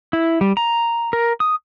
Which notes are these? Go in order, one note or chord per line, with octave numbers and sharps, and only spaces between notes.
E4
G3
A#5
A#4
D#6